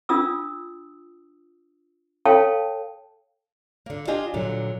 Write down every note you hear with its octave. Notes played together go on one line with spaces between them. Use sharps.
D4 F4 D#6 E6
A4 C#5 F5 G5 A5
D3 A#3
D4 F4 G4 D#5 G#5
A#2 D3 F#3 G3